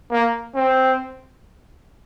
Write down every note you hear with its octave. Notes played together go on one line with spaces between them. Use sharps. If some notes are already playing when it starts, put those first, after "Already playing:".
A#3
C4